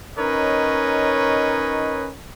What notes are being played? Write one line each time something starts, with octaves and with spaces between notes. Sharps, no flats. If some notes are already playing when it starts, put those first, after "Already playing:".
C#4 D#4 A#4 B4 C#5 D#5